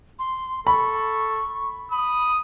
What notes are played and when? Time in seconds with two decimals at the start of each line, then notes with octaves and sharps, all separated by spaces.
0.19 C6
0.67 A4 B5 C#6
1.91 B5 D#6